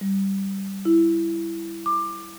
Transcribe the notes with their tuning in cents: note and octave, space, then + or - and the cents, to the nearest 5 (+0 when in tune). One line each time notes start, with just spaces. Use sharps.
G3 -5
E4 +15
D6 +20